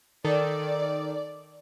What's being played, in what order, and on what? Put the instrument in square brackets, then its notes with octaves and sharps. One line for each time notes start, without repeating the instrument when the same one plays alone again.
[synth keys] D#3 A4 [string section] D5